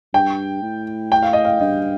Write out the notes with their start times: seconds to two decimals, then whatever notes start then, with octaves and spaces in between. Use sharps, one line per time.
0.14 G2 G5
0.62 A2
1.12 G5
1.22 F5
1.33 D#5
1.45 F5
1.60 G2 D#5